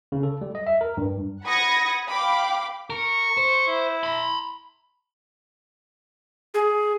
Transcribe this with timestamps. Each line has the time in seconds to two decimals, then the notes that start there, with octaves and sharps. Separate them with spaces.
0.12 C#3
0.23 A4
0.41 G3
0.55 D#5
0.67 E5
0.81 A#4
0.97 G2
1.43 F#5 B5 D#6 G#6 A#6 C#7
2.08 F5 G5 B5 D6
2.90 A#4 C#6
3.37 C5
3.68 E4
4.03 B5 C6
6.54 G#4